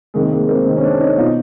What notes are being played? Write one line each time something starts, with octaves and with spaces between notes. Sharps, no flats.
C3 D#3 G#3 A#3
G#3 A#3
A#3 C4
C3 D#3
C#4
C4 D4
C#4 D#4
B2 D#4 F4